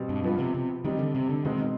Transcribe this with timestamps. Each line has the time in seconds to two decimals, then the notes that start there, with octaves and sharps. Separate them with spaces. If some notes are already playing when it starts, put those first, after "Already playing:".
Already playing: B2 G3 C4
0.09 G2
0.24 G2 F3 B3 F4
0.39 C3
0.54 C3
0.85 D#3 G3 C4 D#4
0.99 D3
1.15 C3
1.29 D3
1.45 B2 D#3 G#3 C4 D#4